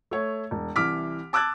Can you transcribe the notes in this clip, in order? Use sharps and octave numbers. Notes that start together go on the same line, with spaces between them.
A3 C#5
E1
C2 E3 D6 F6 B6
A5 D6 E6 F#6 G#6 A6